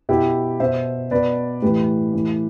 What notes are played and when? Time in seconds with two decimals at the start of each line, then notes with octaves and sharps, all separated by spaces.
0.09 B2 E4 G4
0.60 B2 C5 E5
1.11 B2 B4 D5
1.62 A2 E3 G4 B4
2.13 A2 E3